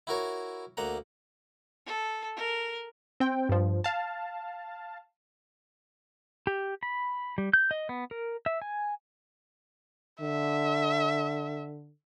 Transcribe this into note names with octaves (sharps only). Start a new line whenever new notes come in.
E4 F#4 A#4 C#5
D2 A#3 F#5 A#5
A4
A#4
C4 G5
G2 F3
F5 A5
G4
B5
G3
G6
D#5
B3
A#4
E5
G#5
D3 E5